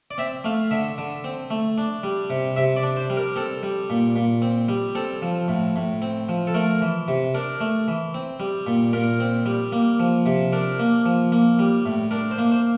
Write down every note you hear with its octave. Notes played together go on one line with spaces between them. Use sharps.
D5
C4 E5
A3 F5
D3 E5
D3
C4
A3
D4
G3
C3
C3 E5
D5
D4
C5
G3
A#4
C4 A4
G3
A#2
A#2
C4
G3
C4 A4
F3
A2
A2
C4
F3
A4
A3 A#4
E3
C3
D4 A#4
A3
E3
C4
G3
A#2
A#2 A#4
C4
G3
A#3
F3
C3
D4 A#4
A#3
F3
A#3
G3
A2
D4 A#4
C5
A#3
C5